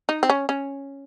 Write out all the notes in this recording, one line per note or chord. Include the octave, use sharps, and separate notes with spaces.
D#4
C4
C#4
C#4